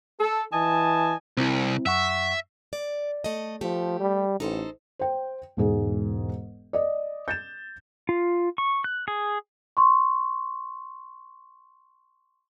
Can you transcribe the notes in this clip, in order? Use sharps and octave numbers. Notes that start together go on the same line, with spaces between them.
A4
E3 D#5 G#5 A5
C2 C4 E4
F#2 E5 F#5 C#6
D5
A3 D#5
F3 A3 G4
G3
A1 D#4 A4 C5
C5 G5
E1 G#2 G#4
D5 D#5
G6 A6 E7
F4
C#6
F#6
G#4
C6 C#6